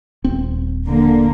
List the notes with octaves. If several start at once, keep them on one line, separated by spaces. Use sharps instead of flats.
D#1 C4
D3 A#3